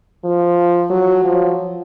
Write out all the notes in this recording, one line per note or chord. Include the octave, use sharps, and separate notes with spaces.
F3
F#3
F3